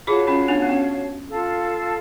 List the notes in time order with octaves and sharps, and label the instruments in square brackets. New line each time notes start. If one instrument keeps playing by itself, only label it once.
[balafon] F4 G#4 [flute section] F#4 C#5 F5 A5
[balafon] C#4 F4
B3 D4
B3
C#4
[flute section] F4 A4 F5 A5